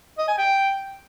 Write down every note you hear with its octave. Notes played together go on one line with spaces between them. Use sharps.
D#5
G#5
G5